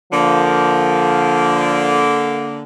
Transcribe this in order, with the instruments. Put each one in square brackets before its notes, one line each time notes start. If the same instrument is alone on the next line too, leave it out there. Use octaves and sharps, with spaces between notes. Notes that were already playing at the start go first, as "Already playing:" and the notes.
[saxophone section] D3 A#3 [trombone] F3